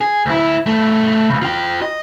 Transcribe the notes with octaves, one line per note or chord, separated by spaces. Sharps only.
G#4
D2 E4
G2 A3
C#2 C#3
F4 G5
D#5